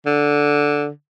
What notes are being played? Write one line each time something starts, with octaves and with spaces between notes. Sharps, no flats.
D3